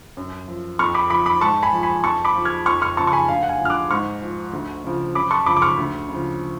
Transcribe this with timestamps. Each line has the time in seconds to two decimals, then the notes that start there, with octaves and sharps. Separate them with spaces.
0.17 F#2
0.48 F3
0.79 F2 C#6 F6
0.95 B5 D6
1.10 F3 B5 D6
1.26 B5 D6
1.41 G#2 A5 C#6
1.63 G#5 B5
1.73 F3
1.83 G#5 B5
2.04 F2 A5 C#6
2.25 B5 D6
2.35 F3
2.45 F6 G#6
2.66 F2 C#6 F6
2.82 C#6 F6
2.97 C#3 F3 A5 C#6
3.07 C#6
3.13 G#5 B5
3.28 D2 F5
3.43 F#5
3.49 F5 G#5
3.60 D3 F3
3.65 F6
3.70 D6 F#6
3.91 G#2 C#6 F6
4.22 F3
4.53 D2
4.84 C#3 F3
5.15 F#2 B5 D6
5.31 A5 C#6
5.46 C#3 F3 B5 D6
5.56 D6
5.62 C#6 F6
5.77 D2
6.09 C#3 F3